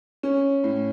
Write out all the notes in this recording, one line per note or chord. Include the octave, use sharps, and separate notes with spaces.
C#4
A2